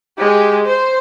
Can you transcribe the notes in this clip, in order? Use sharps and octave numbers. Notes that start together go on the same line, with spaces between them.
G#3 G4
C5